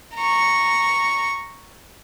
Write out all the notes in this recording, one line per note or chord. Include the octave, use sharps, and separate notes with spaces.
A#5 C#6